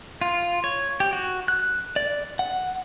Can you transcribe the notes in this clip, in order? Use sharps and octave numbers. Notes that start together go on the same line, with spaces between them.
F4
C#5
G4
F#4
F#6
D5
F#5